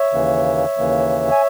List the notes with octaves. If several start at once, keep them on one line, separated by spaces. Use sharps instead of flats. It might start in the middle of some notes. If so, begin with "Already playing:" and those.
Already playing: C#5 E5
D#2 C#3 E3 A#3
D#2 C#3 E3 A#3
G#5